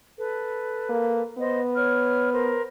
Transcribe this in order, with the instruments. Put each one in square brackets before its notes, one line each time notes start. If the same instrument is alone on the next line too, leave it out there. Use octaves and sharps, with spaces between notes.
[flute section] A4 B4
[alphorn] A#3
[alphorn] B3 [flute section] C5 D#5
[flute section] C#5 F6
A#4 C5